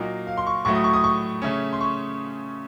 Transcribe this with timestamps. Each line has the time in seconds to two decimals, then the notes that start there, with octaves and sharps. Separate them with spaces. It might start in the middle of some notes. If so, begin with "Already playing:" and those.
Already playing: A#2 F#3 A#3 D#4
0.27 F5
0.37 C6
0.47 C#6
0.65 A2 F#3 A3 C#6
0.75 D#6
0.84 C#6
0.94 D#6
1.04 C#6
1.42 C#3 A3 C#4
1.73 C6
1.81 C#6